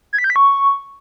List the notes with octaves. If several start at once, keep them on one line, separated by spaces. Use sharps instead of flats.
G#6
B6
G6
B6
C#6